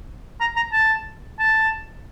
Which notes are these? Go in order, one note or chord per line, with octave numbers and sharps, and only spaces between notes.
A#5
A#5
A5
A5